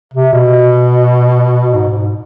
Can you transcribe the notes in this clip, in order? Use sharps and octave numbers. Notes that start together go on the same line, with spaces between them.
C3
B2
G#2
G#2